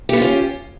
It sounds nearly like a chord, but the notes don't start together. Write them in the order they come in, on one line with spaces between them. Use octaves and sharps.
G4 B3 F4 C#4